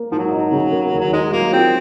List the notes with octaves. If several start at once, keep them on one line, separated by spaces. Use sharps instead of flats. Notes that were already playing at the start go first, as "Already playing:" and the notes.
Already playing: A#3
G#2 F3
F#3
D#4
C#3
A#3
D#2
F#3
G#3 D#4
F#3 A#3
C4 F4